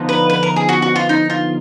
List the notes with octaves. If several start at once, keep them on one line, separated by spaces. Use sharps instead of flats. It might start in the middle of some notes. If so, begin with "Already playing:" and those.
Already playing: D3 F3 B3 D#4
B4
B4
A#4
G#4
F#4
F#4
F4
D#4
F4